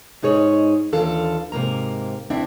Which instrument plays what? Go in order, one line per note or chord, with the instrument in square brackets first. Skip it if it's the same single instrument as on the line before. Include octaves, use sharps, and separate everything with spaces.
[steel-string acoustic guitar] G#2 D#4 G#4 C#5 G#5
D#2 E3 D4 F4 A4 F5
G#2 C3 A#3 A#5
D2 C4 D4 E4 E5